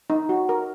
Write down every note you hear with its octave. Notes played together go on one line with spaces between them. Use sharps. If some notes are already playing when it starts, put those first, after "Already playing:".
D#4
F#4
A#4